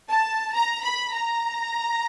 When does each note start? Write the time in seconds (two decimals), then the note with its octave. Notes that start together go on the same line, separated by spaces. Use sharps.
0.10 A5
0.54 A#5
0.84 B5
1.13 A#5